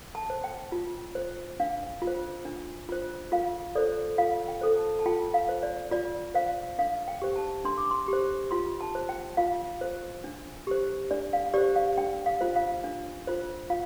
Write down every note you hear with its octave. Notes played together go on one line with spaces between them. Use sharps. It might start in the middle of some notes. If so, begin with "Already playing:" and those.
A5
C5
G5
F4
C5
D4 F5
F4
C5
D4
F4 C5
F4 F5
A4 C5 D5
F4 F5
G5
A4 C5
A5
A5
F4 G5
F5
C5
D5
F4 D5
C5 F5
D4 F5
G5
G4 C5
A5
D4 C6
D6
C6
G4 C5
F4 C6
A5
C5
G5
F4 F5
C5
D4
G4 C5
D4 D5
F5
G4 C5 D5
F5
D4 G5
F5
F4 C5
F5
D4
F4 C5
F4 F5